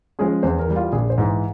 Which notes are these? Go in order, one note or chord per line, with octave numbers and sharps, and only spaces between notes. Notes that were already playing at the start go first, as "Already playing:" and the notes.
F3 G#3 C#4 G#4
E2 C5
A#4
E3 G3
F4
A#1 G#4
C5
G#2 E3